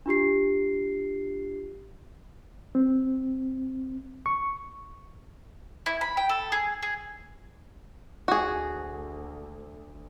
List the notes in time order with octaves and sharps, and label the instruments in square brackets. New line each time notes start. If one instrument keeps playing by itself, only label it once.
[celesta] D4 F4 G4 C7
[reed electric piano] C4
C#6
[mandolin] E4
B5
G5
A4
G#4
G#4
[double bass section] D2 [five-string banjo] F#4 G#4